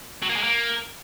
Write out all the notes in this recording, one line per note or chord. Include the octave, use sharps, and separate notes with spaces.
F#3
A#3
G#3
A#3